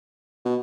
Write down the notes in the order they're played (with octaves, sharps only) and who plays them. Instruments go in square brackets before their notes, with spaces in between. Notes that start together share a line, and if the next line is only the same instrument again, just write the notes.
[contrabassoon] B2